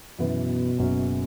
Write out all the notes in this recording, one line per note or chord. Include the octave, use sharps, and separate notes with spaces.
F#2 B2 E3 B3
F#1 F#2 F#3 C#4